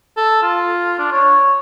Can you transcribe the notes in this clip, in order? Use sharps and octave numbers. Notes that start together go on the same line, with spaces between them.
A4
F4
D4
C#5